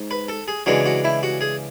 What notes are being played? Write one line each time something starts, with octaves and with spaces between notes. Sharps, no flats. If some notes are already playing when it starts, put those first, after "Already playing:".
Already playing: G#2
B4
A4
G#4
C#3 E3 G#3 D4 F#4
F#4
E4
F#4
G#4